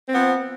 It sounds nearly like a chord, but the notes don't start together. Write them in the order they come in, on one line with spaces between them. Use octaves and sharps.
C4 B3 F3